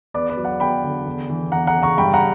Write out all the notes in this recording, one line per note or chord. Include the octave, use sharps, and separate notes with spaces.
E2 B4 D5
B4 D5
F#3
D5 F#5
E2 G5 B5
D3
E2
E3
E2 F#5 A#5
F#5 A#5
C#3
A#5 C#6
G2 G5 B5
F#5 A#5